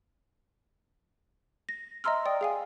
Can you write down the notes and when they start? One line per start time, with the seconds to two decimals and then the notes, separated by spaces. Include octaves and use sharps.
1.69 A#6
2.04 D#5 E5 A#5 C6 E6 F6
2.26 D5 G5 D#6
2.41 G#4 F5 G#5